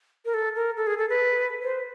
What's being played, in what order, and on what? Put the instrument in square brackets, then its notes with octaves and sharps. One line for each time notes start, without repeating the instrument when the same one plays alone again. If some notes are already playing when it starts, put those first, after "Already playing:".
[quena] A#4
A4
A#4
A4
G#4
A4
B4
C5